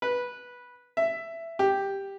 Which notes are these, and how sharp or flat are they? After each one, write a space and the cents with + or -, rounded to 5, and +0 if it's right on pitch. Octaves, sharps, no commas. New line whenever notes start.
B4 -10
E5 +10
G4 +5